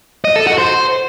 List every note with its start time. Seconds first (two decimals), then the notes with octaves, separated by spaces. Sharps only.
0.25 D#5
0.36 A4
0.47 F#4
0.58 C5